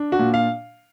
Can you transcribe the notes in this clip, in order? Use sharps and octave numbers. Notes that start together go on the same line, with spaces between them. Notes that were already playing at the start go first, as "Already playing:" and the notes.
Already playing: D4
F#4
A#2
F5